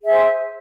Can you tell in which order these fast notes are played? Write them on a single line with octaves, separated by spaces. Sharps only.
G#4 E5 C5